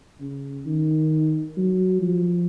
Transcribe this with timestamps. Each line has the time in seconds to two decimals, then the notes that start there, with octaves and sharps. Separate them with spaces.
0.20 C#3
0.66 D#3
1.57 F#3
2.02 F3